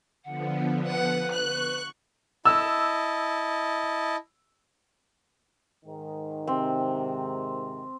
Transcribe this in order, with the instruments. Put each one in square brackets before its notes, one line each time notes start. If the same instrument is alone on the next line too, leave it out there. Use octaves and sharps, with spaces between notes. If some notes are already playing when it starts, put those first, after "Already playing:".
[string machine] D3 F3 B3 [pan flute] F#5
[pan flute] B4 [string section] F#5
[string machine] C#6 [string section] F#6
[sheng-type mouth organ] E4 D#5 A5 [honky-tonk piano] E6
[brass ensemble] G#2 D#3
[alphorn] C3 [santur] C4